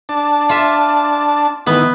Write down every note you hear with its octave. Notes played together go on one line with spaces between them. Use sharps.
D4 A5
F4 E5
D#3 E3 B3